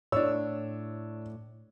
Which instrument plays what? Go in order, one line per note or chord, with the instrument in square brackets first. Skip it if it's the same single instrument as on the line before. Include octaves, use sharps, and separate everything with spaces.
[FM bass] A2 [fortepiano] D4 E6 [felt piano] C#5